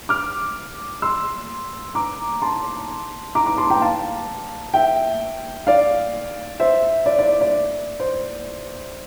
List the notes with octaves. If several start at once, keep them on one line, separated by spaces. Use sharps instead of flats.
D6 F6
C6 E6
A#5 D6
A5 C6
A#5 D6
A#5 D6
A5 C6
G5 A#5
F5 A5
E5 G5
D5 F5
C5 E5
D5
D5
D5
C5